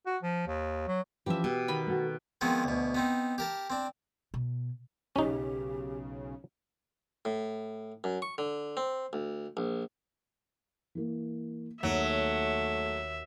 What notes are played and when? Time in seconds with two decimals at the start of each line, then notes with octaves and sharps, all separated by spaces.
0.06 F#4
0.23 F3
0.47 D#2
0.87 F#3
1.26 E3 F3 C#4 G4 E5
1.44 B2 G4
1.68 D#3 B3 B5
1.87 A3 F#4
2.41 D#3 F3 G#3 B3 C4
2.64 D2 B2
2.95 B3 C4 D#4
3.38 G4 A#4 A5
3.70 C4 D4
4.34 B2
5.16 B1 C#3 C#4 D#4 G4
7.25 A2
8.04 F#2
8.22 C#6
8.38 D3
8.77 C4
9.13 D2
9.57 A#1
10.95 E3 A#3
11.83 D#2 F#3 A3 E5